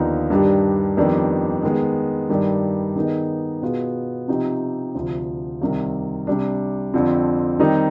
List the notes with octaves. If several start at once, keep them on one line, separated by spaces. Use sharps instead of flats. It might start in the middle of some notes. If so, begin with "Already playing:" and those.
Already playing: D#2 D3 F3 B3 D#4
G2 D#3 G3 D4 G4
F2 D#3 G3 B3 D4
D#3 G#3 B3
G2 D#3 G3
D#3 B3 D#4 G#4
B2 B3 F4 G#4
C3 F3 C4 D#4 G4
D2 C3 F3
C2 C3 D#3
C3 G3 D4
F2 D3 F3 C4
D#3 G3 C4 D#4 G4